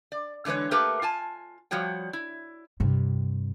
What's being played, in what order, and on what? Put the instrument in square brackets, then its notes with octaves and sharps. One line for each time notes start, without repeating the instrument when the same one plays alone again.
[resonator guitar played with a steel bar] D5
D3 E3 G#3 B4 C#5
A3 A#3 G4 A#4 B4
F4 G#5 A5
F3 G3 F#4 C#5 G5
E4
[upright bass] G2 C3